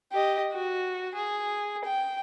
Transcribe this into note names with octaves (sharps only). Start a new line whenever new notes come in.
G4 D#5
F#4
G#4
G5